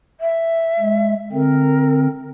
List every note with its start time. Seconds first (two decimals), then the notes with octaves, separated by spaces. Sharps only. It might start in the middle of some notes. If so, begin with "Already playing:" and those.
0.20 E5
0.79 G#3
1.32 D3 C4 A#4